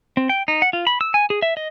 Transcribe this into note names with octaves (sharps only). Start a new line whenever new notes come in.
C4
G5
D#4
F#5
F4
B5
E6
G#5
G#4
E5
D#5